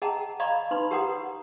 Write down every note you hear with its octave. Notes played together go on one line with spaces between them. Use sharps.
G#4 D#5 F#5 G5 A5 A#5
D5 D#5 F5 A#5 B5 C#6
D#4 B4 B5 C6
G4 A#4 C#5 F#5 A#5 D#6